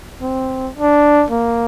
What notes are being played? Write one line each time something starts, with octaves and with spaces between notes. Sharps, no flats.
C4
D4
A#3